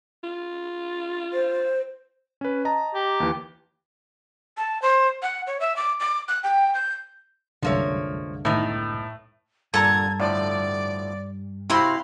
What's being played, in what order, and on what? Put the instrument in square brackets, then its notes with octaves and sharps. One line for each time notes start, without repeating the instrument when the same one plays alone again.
[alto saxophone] F4
[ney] C5
[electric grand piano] C#4 B4
D#5 A5 A#5
[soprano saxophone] G4
[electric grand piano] D#2 E3
[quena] A5
C5
F#5
C#5
E5
D6
D6
F#6
G5
G6
[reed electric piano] C2 F#2 G#3 [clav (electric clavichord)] D3 E5 [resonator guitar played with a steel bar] F3 A#3 C#5
[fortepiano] A2 [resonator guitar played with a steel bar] D#3 B3 D#4
[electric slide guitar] G2 [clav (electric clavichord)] A#2 D3 [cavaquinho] A4 A#5 [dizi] G#6
[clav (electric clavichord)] A2 D3 F3 [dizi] D5
[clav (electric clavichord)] C3 C4 F#4 [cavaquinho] E4 B5 C6 [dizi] F5